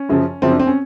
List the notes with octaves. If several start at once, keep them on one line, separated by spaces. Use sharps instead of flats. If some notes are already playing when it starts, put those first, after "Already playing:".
Already playing: C#4
F#2 C#3 F3
F#2 C#3 F3 C4
D4
C4
C#4